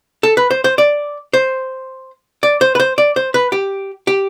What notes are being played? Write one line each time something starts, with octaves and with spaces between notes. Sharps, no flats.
A4
B4
C5
C5
D5
C5
D5
C5
B4
C5
D5
C5
B4
G4
G4